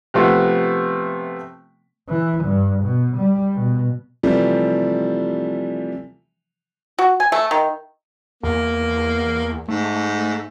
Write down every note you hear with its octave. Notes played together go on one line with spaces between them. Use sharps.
C3 F3 A3 B3
E3
G2
B2
G3
B2
C3 E3 F3 G3 A3
F#4
G#5
A3
D#3
E2 A#3
G#2 A3